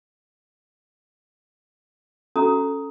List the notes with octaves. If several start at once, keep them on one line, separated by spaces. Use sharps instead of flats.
C#4 F#4 A4 A#5 D#6